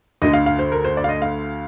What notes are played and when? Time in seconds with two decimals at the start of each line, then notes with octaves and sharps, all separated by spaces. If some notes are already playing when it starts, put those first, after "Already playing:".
0.22 D2 D3 D#5
0.33 F5
0.46 F5
0.59 C5
0.72 A#4
0.85 C5
0.97 D5
1.04 F5
1.09 D#5
1.22 F5